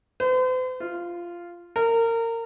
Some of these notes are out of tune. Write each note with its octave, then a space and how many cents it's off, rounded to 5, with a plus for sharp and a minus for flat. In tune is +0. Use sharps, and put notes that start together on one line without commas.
C5 -45
F4 -10
A#4 -25